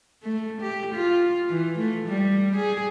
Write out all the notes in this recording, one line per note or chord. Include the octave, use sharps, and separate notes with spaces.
A3
G4
F4
E3
A3
G3
G#4